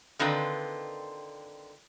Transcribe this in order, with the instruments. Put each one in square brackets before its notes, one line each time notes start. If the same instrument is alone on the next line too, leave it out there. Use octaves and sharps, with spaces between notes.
[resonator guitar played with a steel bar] D3 D#3 C4 F4 B4 D5